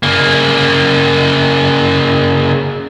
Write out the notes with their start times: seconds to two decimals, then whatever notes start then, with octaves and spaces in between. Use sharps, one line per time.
0.03 C#3 A#3